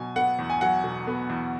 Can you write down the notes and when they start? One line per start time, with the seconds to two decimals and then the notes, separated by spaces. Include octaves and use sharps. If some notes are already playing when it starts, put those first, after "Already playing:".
Already playing: B2 F#3 G#5
0.16 B3 F#5
0.39 E2
0.50 G#5
0.61 F#3 F#5
0.84 B2
1.07 B3
1.30 E2